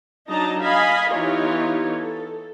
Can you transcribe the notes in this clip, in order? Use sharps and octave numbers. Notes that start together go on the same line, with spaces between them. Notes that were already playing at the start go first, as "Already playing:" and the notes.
F#3 D4 D#4 D#5 A5 A#5
D#5 F5 G#5 B5
E3 B3 D#4 F4 G4 C#5
A4